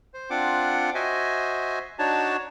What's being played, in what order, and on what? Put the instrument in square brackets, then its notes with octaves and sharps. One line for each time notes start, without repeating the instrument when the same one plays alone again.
[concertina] C5
C4 D4 F4 F#5 D6
F#4 C5 D#5 E5 G#5
D4 D#4 F#4 C#5 A5